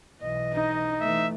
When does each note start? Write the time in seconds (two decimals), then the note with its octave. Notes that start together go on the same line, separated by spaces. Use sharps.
0.21 B1 E3 D#5
0.54 D#4
1.01 E3 A3 E5